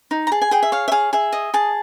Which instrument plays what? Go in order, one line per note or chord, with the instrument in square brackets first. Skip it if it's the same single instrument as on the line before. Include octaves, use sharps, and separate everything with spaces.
[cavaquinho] D#4
A#5
G#4 A5
G#5
G#4 G5
E5
C#5 F5
E5
G#4 F5
G#4 E5
D#5
G#4 A5